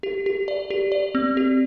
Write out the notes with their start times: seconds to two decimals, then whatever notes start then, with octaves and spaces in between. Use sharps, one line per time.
0.03 G4
0.26 G4
0.48 D5
0.70 G4
0.92 D5
1.15 C4
1.37 G4